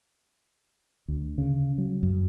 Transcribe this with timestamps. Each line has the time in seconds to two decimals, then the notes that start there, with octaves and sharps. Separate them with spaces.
1.08 D2
1.38 C#3
1.78 F#3
2.03 F#2